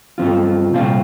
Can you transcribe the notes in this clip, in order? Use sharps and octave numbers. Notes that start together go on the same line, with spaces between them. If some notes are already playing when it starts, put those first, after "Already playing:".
G2 F3 C4 F4
C2 A#2 F3 C4 F4